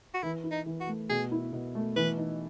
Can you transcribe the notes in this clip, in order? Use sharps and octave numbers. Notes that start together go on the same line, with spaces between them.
F#4
E3 E4
E4
D#4
E3
F#4
A3
B2 G#4
E4
B2
A3
E3 B4
D#4